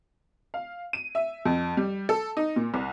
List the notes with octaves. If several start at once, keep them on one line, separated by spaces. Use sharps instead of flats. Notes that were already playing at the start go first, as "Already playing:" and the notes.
F5
D#7
E5
F2
G3
A4
D#4
A#2
C2